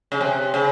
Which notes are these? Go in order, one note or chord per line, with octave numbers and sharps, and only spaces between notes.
C#3
C3
C#3